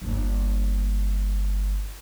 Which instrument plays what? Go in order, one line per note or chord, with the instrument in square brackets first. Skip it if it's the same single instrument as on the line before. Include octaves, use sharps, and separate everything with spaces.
[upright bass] G1 A#3